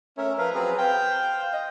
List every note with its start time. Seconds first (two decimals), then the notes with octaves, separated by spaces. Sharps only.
0.18 A3 C#4 A#4 E5
0.38 F3 A#4 B4 F5
0.55 F#3 C4 G#4
0.79 C5 F5 G5
1.54 D#5